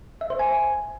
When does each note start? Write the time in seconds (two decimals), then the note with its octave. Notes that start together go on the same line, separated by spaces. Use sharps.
0.21 E5
0.30 C5
0.39 G#5